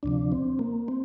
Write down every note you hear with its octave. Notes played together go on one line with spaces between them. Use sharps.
D2 C3 F3 D4
C4
A#3
C4